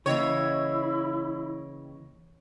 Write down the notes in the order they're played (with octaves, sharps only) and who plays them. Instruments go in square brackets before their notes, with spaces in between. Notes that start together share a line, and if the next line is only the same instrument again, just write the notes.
[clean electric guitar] C#3 E3 A#3 [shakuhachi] E4 [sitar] C#5 [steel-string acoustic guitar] D#5 G5